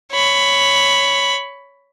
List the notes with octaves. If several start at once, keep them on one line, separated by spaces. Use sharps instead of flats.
C#5 B5